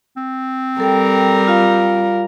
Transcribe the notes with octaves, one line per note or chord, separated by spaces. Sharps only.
C4
G3 A4 A#4 G5
F4 F5